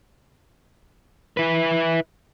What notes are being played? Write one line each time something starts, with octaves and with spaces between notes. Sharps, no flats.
E4 B4